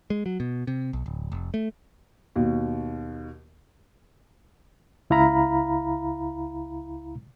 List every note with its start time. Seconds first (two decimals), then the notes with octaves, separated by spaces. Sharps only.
0.10 G#3
0.26 F#3
0.40 B2
0.67 C3
0.93 B1
1.06 D1
1.32 F1
1.54 A3
2.36 D#2 B2
5.10 C#2 E4 F5 A#5 B5